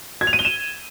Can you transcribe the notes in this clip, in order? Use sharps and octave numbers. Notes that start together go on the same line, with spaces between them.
G#6
F7
D#7
G7
E7